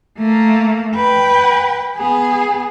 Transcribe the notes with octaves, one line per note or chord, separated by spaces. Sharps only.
A3 A#3
B4 G5
B3 G#4